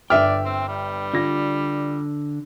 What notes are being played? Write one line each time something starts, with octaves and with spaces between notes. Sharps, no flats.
G1 D5 E5 G5 F6
C4
G3
D3 F4 A#6